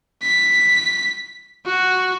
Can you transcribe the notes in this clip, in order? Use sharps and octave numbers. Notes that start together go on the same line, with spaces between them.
B6
F#4